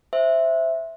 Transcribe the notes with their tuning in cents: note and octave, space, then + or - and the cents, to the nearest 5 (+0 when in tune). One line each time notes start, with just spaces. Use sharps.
C5 +5 E5 +0